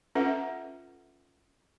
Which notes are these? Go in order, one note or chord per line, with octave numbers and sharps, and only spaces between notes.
C#4 F4 A4 B4 E5 F#5